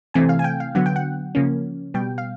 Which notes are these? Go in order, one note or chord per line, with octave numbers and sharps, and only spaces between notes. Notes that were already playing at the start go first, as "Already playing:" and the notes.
C3 E3 A3 C4 G#5
F5
G#5
G5
F5
D3 F#3 B3 F#5
G5
F#5
C#3 F3 A#3 C#4
B2 G3 B3 G5
F5